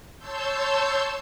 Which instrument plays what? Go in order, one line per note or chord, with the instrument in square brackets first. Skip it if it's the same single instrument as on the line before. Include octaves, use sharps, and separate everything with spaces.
[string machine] C#5 A5 C6 E6 G6